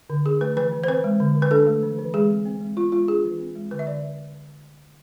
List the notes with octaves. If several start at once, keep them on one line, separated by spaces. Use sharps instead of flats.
D3
D4 G#4
A3 B4
E3 B4
E3
C5
C4 B4
G#3
D3
D3
B4
D4 A4
A3
E3
E3
G#3 G#4
C4
C4
G#3
B3 F4
G#3 F4
D4 G#4
E3
C4
G#3
D3 B4
E5
D3 D5